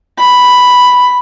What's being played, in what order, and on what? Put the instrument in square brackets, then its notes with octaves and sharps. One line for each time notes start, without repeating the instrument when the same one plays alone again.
[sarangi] B5